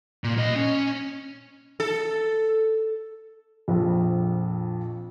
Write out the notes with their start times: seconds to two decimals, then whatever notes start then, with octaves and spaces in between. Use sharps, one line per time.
0.24 A#2
0.38 A#3 D#5
0.56 C#4
1.80 A4
3.68 A#1 F2